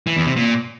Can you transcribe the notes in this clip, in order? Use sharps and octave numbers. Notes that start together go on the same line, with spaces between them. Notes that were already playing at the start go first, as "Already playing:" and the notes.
E3
E2
C3
A#2